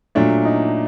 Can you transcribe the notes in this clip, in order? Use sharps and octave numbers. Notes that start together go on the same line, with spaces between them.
A#2 F#3 A3 D4
D#4